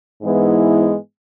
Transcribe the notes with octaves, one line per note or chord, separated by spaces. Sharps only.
G#2 E3 G#3 B3 E4